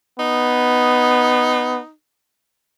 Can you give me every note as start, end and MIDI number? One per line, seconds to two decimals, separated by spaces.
0.19 1.81 59
0.19 1.92 63